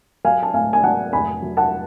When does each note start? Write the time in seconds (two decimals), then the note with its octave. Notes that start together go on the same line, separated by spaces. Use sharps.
0.24 F#3 F5 G#5
0.43 A5
0.54 A2 F5 G#5
0.73 G#5
0.83 F#3 F#5 A5
1.13 F1 G#5 B5
1.42 F#3
1.57 F#5 A5